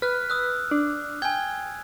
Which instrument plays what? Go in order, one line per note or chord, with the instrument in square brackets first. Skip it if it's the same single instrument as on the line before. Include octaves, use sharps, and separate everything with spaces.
[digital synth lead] B4 [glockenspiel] F6 F#6
[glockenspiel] D#6 E6 F#6
[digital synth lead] D4
[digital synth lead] G5 [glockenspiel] G#5 G#6